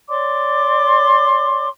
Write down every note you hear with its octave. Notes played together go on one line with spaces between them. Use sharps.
C#5 D5 C6 D6